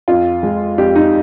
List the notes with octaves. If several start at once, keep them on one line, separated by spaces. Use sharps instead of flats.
F2 F4
G#3
F2 G4
D#4